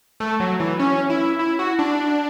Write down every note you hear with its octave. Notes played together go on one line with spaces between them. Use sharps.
A3
F#3
E3
C#4
E4
E4
F#4
D4